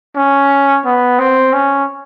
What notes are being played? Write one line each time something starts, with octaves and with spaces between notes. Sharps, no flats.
C#4
B3
C4
C#4